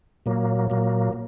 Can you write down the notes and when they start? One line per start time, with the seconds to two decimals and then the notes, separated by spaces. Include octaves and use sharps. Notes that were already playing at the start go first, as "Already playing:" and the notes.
0.26 A#2 F#3 A#3
0.70 A#2 F#3 A#3